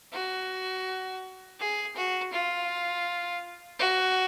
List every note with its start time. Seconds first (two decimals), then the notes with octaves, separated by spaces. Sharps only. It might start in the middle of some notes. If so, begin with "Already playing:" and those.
0.12 F#4
1.59 G#4
1.96 F#4
2.33 F4
3.79 F#4